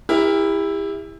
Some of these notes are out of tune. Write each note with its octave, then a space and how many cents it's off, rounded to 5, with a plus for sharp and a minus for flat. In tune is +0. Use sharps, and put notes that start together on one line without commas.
E4 +0 G4 +40 A#4 +0